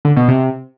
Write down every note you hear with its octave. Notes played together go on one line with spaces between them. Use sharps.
D3
B2
C3